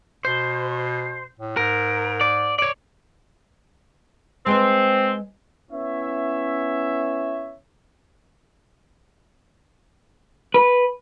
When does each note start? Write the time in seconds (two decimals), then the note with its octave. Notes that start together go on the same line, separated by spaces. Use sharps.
0.25 B2 C5
1.39 A2
1.57 G#2 A#4
2.21 D5
2.59 C#5 D5
4.46 G#3 C4 B4 C5
5.71 B3 C#4 E4 C#5 E5
10.54 B4